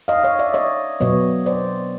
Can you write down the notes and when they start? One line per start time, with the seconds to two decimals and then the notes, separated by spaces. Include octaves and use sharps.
0.08 D#5 F5
0.24 C#5 D#5
0.39 D5 E5
0.54 C#5 D#5
1.00 B2 F#3 B3 C#5 D#5
1.46 C5 D5